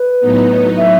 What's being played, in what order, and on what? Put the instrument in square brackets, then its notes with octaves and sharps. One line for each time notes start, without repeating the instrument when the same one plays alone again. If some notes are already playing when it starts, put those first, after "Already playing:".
Already playing: [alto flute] B4
[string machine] A2 F#3 B3 D#4
[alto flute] E5